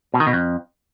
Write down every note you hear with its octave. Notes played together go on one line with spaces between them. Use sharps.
B2
D#3
B2
F2